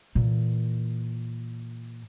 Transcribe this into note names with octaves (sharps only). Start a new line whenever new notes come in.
A#2 E3